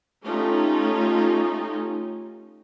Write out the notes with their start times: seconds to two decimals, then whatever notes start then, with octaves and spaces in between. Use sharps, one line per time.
0.25 A3 C#4 D#4 F4 G4